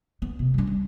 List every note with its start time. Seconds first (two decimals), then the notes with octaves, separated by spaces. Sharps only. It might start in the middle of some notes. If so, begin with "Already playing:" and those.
0.22 B3
0.39 C3
0.54 G3 D4
0.67 G3